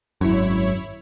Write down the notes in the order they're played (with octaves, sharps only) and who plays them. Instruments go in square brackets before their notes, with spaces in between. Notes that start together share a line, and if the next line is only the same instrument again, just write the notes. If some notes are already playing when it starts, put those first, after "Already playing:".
[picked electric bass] G#1 F#2 [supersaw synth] E4 C#5